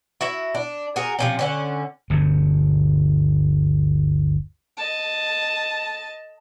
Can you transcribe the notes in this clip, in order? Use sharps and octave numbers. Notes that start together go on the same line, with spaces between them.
E4 F#4 E5
D4
F#4 G#4 A#4
C3 F3 C#4
D3 C#4 F#5
G1 D2 G2 B2
D#5 A5